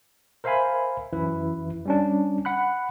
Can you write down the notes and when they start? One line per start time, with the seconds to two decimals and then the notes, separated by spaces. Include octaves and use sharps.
0.44 A#4 C5 E5 F5 G#5 B5
1.13 F#2 E3 E4 B4
1.85 G3 C#4 D4
2.45 F#5 B5 F#6